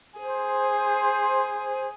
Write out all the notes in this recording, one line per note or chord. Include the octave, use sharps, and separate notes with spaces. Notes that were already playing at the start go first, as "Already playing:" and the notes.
G#4 C5